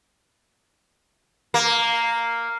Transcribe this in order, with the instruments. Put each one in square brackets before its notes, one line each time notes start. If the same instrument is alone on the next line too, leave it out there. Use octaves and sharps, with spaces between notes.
[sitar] A#3